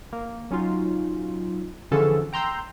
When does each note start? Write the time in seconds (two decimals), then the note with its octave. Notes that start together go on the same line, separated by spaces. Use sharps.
0.13 A#3
0.51 F#3 C#4 D#4 F4
1.91 D3 E3 F3 C#4 G#4 A4
2.33 G5 A#5 C6 E6 G6